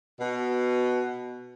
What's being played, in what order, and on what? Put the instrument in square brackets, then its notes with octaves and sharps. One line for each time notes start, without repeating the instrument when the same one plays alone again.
[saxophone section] B2